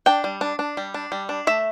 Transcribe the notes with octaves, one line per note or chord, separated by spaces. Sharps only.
D4 G5
G3
D4
D4
G3
D4
G3
D4
A3 E5